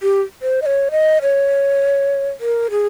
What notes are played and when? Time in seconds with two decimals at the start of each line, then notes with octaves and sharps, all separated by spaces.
0.02 G4
0.42 C5
0.62 D#5
0.66 C#5
0.91 D#5
1.22 C#5
2.40 A#4
2.71 G#4